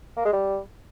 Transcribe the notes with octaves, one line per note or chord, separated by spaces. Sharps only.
A#3
G#3
G3